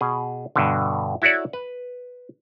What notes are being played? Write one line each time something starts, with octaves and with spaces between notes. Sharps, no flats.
B2 G#4
G2 B2 D3
E4 F#4 A4 C#5 D5
B4